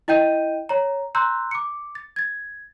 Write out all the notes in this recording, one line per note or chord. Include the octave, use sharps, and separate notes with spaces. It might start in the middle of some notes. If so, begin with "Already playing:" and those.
E4 D#5 G5 G6 D#7
C#5 A#5
A#5 C6 E6 F#6 G6
D6 C#7
A6
G#6 A6